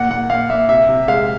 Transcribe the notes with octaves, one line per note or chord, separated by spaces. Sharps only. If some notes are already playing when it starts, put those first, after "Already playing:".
Already playing: A#2 F#5
A#2 F#5
A#2 F5
A#2 E5
C3 E5
C3
G#3 F5